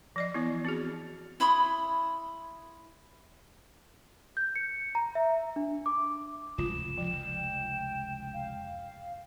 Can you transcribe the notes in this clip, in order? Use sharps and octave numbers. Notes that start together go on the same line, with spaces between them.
F3 D5 D#5
E3 B3 E4
C4 F#4 G#4
E4 B5 C6 D#6
G6
C#7
A#5
E5
D4
D6
F1 C#2 F4 E7
F3 G5
F5